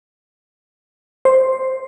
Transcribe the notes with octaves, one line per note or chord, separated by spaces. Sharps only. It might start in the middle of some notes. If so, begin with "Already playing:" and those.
C5